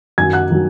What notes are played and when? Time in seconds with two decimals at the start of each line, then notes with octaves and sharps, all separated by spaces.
0.18 F#2 D#3 F#3 G#5 G#6
0.33 F#5 F#6
0.50 D#3 F#3